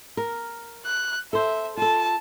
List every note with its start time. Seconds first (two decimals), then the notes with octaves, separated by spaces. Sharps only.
0.17 A#4
0.85 F#6
1.33 A4 C5 E5
1.77 F4 A4 A5